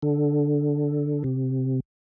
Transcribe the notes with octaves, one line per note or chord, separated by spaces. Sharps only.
D3
C3